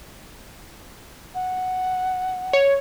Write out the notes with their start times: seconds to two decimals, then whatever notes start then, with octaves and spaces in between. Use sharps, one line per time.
1.35 F#5
2.53 C#5